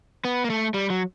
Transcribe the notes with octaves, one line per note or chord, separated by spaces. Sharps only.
B3
A#3
A3
G3
F#3